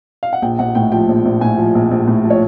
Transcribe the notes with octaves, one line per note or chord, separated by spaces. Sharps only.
F5
F#5
A#1 G5
A#1 F#5
A2 G5
F3 G5
A#1
A#1
A2 G#5
F3
A#1
A#1
A2
F3
C#5